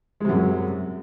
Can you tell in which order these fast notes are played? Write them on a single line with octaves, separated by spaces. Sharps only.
G#3 C3 F#2